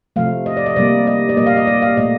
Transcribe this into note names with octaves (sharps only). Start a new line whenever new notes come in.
C3 F3 A3 F5
D#5
D5
D#5
C3 G3 A#3 D5
D#5
D5
A#2 G3 A#3 D#5
F5
D#5
D5
F5
A#2 A3 D#5